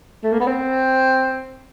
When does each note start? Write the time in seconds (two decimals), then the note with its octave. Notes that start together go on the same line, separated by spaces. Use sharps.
0.23 A3
0.32 A#3
0.40 B3
0.47 C4